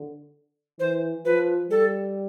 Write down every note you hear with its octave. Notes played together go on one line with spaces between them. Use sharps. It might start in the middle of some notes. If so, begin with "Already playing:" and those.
Already playing: D3
E3 C5
F3 B4
G3 A4